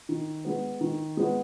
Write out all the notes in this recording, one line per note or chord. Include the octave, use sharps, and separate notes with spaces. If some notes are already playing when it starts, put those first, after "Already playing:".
D#3
G#3 B3
D#3
G#3 B3